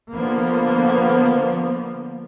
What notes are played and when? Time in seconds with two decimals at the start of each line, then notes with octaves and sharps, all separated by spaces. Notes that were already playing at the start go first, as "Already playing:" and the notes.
0.11 D3 F3 A#3 B3